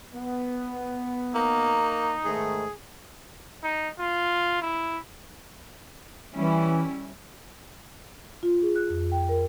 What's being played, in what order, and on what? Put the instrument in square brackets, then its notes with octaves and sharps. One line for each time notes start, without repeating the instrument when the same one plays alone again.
[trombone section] B3
[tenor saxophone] A#3 [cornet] D#4
[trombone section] G#2 D#3 A3 [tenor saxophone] G#4
[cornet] D#4
F4
E4
[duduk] E3 [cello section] G3 C#4 E4
[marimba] F4
G#4
F#6
F2
G5
A#4